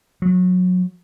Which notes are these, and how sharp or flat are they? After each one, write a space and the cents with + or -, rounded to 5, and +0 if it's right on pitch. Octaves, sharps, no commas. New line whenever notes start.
F#3 -25